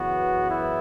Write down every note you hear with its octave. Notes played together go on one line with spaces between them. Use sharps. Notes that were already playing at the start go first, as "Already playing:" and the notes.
Already playing: F#2 C#3 E3 B3 F#4
E4